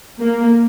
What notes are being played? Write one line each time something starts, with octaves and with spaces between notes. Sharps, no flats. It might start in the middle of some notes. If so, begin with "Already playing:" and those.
A#3